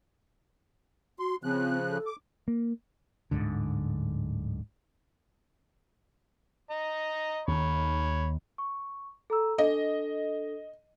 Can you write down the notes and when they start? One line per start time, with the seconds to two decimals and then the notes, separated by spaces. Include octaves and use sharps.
1.19 F#4 C6
1.44 C#3 F3 C4 F#6
1.90 A4
2.06 D6
2.48 A#3
3.31 D1 G1 G#2 D3
6.70 D#5 A#5
7.48 D#2 D#3 C#5 B5
8.58 C#6
9.30 A4 A#5 E6
9.58 D4 A4 D#5